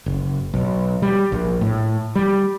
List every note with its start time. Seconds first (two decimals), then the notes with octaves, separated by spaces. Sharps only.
0.06 F#1
0.54 B1
1.02 G3
1.32 A#1
1.61 A2
2.16 G3